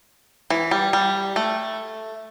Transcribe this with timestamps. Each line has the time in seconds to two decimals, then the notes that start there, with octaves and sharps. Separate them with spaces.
0.50 E3
0.71 G3
0.93 G3
1.36 A3